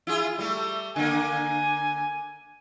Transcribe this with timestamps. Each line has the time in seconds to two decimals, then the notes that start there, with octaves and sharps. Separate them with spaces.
0.07 E4 F4 G#4
0.38 G3 A3
0.96 D3 A#3 G#5